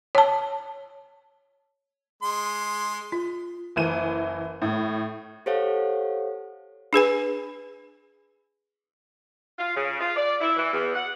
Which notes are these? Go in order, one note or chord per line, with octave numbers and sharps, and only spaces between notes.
C#5 A5
G#3 C6
F4
F#1 E3 D#7
A2
G4 A4 C5 C#5 F5 F#5
D4 G#4 B4 G#5
F4
C#3
F4
D5
E4
E3
E2
F#5